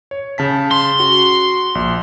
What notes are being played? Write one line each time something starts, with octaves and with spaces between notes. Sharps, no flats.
C#5
C#3 A5 B6
C6
F#4
A#1